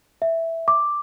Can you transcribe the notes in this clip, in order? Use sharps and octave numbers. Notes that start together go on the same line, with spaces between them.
E5
D6